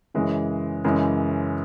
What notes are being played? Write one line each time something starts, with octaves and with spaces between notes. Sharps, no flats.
F#2 C#3 E3 G#3
F#2 C#3 E3 G#3